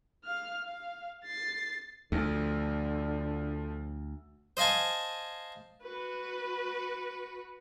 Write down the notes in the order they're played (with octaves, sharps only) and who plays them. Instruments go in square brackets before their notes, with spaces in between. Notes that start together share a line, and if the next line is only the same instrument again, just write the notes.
[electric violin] F5 F6
F5
A6 C7
[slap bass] D2 [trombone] D3 [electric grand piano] F3 A3
[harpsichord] C5 D#5 F5 G#5 A5
[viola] F#4 B4